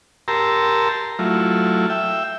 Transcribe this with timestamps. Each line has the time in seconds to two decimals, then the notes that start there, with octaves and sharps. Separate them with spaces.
0.28 G4 A#4 A5 A#5 C6 E6
1.19 F#3 A3 E4 F4
1.90 E5 G5